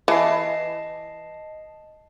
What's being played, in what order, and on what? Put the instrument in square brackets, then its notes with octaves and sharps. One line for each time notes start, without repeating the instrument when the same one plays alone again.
[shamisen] E3 [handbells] D#5 A5 C7